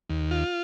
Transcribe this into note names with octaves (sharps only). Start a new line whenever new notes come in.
D#2
F4